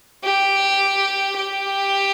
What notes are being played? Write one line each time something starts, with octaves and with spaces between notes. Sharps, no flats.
G4
G4